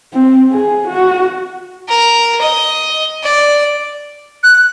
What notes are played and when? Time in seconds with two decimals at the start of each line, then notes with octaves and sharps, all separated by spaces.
0.13 C4
0.52 G#4
0.88 F#4
1.89 A#4
2.42 D#5
3.23 D5
4.43 F#6